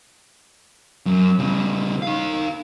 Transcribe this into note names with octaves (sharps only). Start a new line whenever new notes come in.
F#2
C#3 G3
D#4 F5